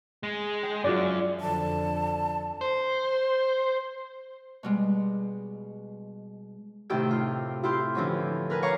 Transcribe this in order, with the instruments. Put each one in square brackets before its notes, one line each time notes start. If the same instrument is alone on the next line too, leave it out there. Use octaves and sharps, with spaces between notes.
[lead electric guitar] G#3
[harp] G5
[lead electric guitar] F#2 [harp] F4 F#4 D5
[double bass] F2 D3 [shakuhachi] A5
[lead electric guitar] C5
[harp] B2 G3 G#3
A2 C3 D#3 G4 G5 E6
F4
E4 F4 G4 C6
D3 E3 F3 C4 C#4
A#4 B4 G#5
C#5 F5 G#5 A#5 C#6 D6